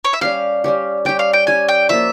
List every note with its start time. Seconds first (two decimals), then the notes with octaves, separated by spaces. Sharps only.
0.05 C#5
0.13 E5
0.21 G3 C#4 G4 F5
0.64 G3 C#4 G4
1.05 G3 C#4 G4 G5
1.19 F5
1.33 G5
1.47 G3 C#4 G4 G#5
1.69 G5
1.89 F3 A#3 F4 E5